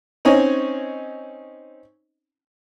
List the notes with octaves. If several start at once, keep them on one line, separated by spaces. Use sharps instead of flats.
C4 C#4 D#4 C#5 D#5 G#5